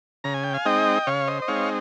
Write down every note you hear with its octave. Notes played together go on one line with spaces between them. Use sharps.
C#3 A#5
G#5
G5
F5 G#5
G#3 C4 D#4 D#5 G5
C#3 C#5 F5
C5 D#5
D#5
G#3 C4 D#4 C#5 F5